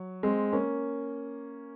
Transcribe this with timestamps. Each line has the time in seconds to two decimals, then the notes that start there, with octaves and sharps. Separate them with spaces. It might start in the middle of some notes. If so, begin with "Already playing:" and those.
Already playing: F#3
0.23 G#3 C4
0.53 A#3 C#4